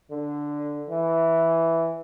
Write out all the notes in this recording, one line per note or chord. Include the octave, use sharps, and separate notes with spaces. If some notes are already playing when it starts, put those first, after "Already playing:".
D3
E3